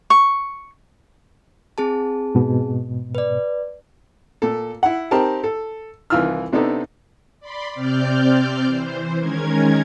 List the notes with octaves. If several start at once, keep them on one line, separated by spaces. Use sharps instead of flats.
C#6
C4 G#4 A5
G#2 B2
B4 D5
A#2 A4
E4 F#5
C4 D#4 G4 A#4 A5
A4
C2 D#3 E3 F4 E6 F6
C3 B3 D4 D#4 A4
D5 B5 C6
C3 C4 D5 F6 G6
E3 C5
D#3 G#3 C#4 A#4 G#6